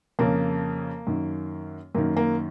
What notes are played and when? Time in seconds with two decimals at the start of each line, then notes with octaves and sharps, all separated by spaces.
0.19 F2 C#3 A#3
1.07 F#2 D#3
1.95 F#2 D#3 A#3
2.17 A#3